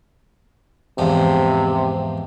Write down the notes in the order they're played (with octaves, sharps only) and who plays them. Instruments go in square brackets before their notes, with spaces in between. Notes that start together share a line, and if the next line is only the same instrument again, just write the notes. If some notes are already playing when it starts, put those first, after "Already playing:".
[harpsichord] E2 G#2 F3 [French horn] C3